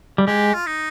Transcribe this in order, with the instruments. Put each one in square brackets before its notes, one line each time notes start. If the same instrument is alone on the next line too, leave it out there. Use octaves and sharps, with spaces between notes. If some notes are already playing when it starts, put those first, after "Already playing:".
[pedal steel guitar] G3
[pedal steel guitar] G#3 [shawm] G4
[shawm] F4
D#4